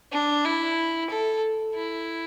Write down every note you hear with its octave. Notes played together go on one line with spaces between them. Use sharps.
D4
E4
A4
E4